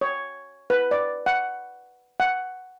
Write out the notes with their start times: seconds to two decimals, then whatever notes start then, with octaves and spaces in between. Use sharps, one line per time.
0.01 C#5
0.70 B4
0.91 D5
1.26 F#5
2.20 F#5